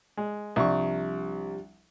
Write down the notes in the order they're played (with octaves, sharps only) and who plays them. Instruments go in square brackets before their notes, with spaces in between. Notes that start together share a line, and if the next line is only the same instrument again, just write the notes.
[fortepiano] G#3
[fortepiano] C2 C#6 [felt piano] F3 G3 D4